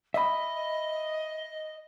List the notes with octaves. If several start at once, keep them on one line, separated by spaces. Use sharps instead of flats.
D#5 E5 B5